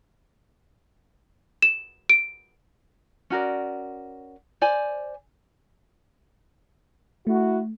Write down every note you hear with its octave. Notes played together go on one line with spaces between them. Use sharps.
E7
D7
C#4 F#4 A#4 D5
C5 D5 G#5
A3 E4 F#4